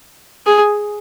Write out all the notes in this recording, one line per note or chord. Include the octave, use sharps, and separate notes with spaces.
G#4